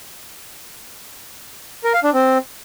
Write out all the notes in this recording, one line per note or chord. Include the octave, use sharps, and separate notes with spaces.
A#4
F5
D4
C4